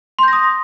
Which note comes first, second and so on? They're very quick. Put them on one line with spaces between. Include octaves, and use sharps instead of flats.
C6 G6 A#6 D#6